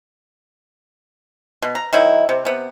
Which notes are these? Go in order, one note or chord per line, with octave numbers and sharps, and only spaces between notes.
B2
A#5
D#3 F#3 E4
C3
C3 B3